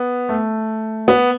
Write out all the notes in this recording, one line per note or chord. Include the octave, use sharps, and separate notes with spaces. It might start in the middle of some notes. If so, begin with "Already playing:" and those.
Already playing: B3
A3
B3